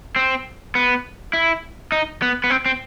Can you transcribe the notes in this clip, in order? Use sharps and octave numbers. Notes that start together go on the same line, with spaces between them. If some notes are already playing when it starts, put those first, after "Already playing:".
C4
B3
E4
D#4
B3
B3
C4
C4